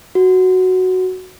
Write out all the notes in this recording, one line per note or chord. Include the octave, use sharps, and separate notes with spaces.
F#4